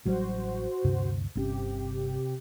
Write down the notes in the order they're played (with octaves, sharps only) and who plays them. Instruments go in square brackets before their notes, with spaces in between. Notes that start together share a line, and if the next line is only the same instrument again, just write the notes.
[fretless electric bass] A1 F#3 G3 [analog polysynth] F#4 C5
[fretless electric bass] D2 G2 C3
[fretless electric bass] G1 C4 C#4 [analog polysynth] C3 G4